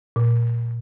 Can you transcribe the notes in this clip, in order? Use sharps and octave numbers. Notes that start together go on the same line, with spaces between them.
A#2